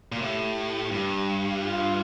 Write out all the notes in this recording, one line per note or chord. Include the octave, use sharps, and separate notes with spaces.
A#2
A2 G4
G2
F4